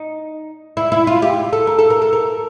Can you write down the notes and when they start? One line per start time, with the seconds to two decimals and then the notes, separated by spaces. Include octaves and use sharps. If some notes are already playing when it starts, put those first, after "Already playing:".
Already playing: D#4
0.77 E4
0.92 E4
1.07 F4
1.22 G4
1.53 A4
1.67 A#4
1.79 A4
1.90 A#4
2.02 A4
2.13 A#4